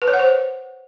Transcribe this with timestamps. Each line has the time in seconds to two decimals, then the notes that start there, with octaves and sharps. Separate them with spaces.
0.02 B4
0.08 C#5
0.13 F#5
0.19 C5